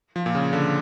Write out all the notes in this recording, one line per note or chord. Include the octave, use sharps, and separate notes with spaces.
F3
A#2
C#3
D3